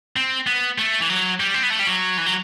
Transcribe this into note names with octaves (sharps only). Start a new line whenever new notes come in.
C4
B3
A3
E3
F#3
G3
C4
B3
A3
G3
F#3
E3
F#3